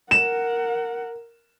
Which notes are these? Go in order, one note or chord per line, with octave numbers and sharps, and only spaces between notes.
A#4 F#5 E7